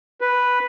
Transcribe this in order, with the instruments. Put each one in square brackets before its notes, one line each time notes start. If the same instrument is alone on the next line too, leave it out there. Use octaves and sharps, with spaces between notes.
[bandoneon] B4